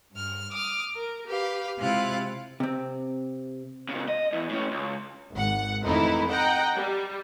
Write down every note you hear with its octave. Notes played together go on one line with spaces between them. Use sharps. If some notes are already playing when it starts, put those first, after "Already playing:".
G2 F6
D6 D#6 F6
A#4
G4 B4 F5
C3 G#3 E4 F4 F5 F#6
C3 C4
A#2 C#3
D#5
E2
A2 C#4
C#2
G#1 F#5
F2 D#3 E3 A3 D#4 E4
D#5 F#5 G5 A#5
G3